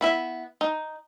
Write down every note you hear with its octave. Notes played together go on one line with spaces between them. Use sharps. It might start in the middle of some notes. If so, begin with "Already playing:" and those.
B3 E4 E5
D#4